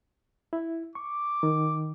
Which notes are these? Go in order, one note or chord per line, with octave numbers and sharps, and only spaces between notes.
E4
C#6 D6
D#3